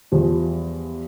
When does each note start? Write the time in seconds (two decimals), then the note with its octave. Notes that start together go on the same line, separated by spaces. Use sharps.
0.12 E2 F3 G3